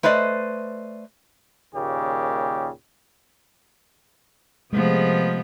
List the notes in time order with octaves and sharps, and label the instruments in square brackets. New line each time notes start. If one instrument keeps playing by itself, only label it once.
[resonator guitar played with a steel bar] A3 B4 C5 D5 D#5
[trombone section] D#2 A#2 C#3 G4
[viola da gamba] C3 F3 B3 [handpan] G#3 A3